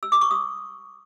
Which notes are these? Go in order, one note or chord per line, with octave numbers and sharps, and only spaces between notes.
E6
D6
C#6
D#6